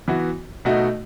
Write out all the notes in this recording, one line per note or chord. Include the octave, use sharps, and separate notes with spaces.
E3 B3 F#4
B2 A3 D#4 F#4